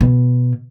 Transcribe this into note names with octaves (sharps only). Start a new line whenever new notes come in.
B2